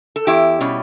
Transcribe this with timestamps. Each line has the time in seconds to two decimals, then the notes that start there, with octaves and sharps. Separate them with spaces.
0.16 A4
0.27 E2 E4 G4
0.61 B2 G3 C#4